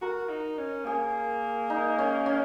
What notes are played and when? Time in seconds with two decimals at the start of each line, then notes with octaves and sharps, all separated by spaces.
0.02 F#4 A#4
0.29 D#4
0.58 C#4
0.85 A#3 G#4
1.70 D#4
1.98 C#4
2.26 C#4